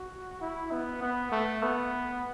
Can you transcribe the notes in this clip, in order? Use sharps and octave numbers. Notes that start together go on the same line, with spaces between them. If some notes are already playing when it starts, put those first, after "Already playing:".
Already playing: F#4
E4
B3
B3
A3
B3